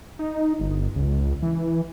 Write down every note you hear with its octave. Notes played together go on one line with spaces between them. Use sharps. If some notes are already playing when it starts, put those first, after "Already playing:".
D#4
G1
C#2
E3